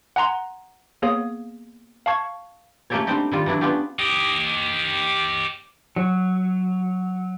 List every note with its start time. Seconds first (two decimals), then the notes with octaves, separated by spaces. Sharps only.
0.16 F#5 G#5 A#5 C6
1.02 A#3 B3 G#4 C#5 F5 D#6
2.06 F5 A5 C#6 G#6
2.90 A3 A#3 C#4 G4 A4 C#5
3.07 G3 C4 D4 D#4 G4
3.32 D#3 G3 F4
3.46 E3 F#3 D4 E4
3.61 B3 C#4 D4 F4 G4
3.99 G4 D#5
5.96 F#3